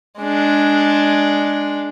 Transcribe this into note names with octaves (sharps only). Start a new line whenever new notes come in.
G#3 D4